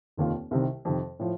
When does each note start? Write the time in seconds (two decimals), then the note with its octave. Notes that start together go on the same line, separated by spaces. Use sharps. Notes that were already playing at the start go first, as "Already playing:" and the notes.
0.17 F1 D#2 D#3 A#3 F4
0.51 C2 C3 D#3
0.85 F2 C3 D#3
1.19 A2 F3